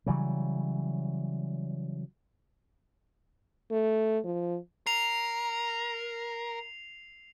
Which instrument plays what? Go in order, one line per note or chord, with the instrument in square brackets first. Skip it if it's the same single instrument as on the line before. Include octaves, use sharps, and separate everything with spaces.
[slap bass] C#3 E3 F#3 G3
[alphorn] A3
F3
[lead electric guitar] A#4 [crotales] C7 F7